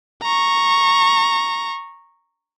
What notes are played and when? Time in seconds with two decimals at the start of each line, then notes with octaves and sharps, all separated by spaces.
0.23 A#5 C#6